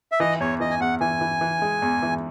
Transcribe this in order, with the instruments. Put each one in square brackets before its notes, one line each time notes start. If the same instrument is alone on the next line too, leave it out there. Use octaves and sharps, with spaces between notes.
[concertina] E5
[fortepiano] E3 [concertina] D#5
[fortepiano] E2 [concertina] C#5
[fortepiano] E3 [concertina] D#5
[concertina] G#5
[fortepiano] E2 [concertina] F#5
[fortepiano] E3 [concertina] G#5
[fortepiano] E3
E3
G#3
E2
E3